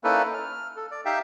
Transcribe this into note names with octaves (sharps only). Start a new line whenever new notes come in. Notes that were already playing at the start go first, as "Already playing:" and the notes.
A#3 C#4 D#4 E4 A4 B4
F6
A4
D5
D#4 G4 E5 F5 G5